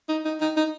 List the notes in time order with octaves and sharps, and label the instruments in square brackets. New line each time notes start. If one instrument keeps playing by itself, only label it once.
[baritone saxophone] D#4
D#4
D#4
D#4